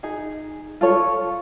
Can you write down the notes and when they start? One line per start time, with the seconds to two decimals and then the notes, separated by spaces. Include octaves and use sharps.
0.03 D#4 G#4
0.81 F4 A4 C#5